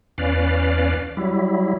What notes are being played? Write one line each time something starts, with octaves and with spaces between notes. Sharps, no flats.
E2 C#4 B4 D5 F5
F#3 G3 E4